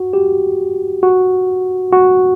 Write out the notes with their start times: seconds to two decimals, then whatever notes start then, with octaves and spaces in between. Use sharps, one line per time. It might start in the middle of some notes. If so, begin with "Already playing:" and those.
Already playing: F#4
0.13 G4
1.03 F#4
1.93 F#4